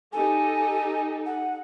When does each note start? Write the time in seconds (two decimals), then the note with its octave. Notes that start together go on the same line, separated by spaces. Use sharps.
0.13 D#4 G4 A4 G#5
1.26 F#5